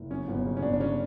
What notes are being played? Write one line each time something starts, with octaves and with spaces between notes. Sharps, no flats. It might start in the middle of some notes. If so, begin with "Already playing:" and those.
Already playing: F#1
F#2 C#4
G1
C#3
C#4
G1 D4
D4
C#3 C#4